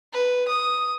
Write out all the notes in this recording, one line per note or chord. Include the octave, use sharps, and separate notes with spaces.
B4
D#6